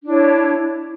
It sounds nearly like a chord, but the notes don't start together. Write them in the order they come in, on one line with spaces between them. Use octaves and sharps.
D4 E4 C#5